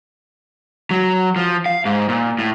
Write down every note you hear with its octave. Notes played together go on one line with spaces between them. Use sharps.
F#3
F3
F5
G#2
A#2
A2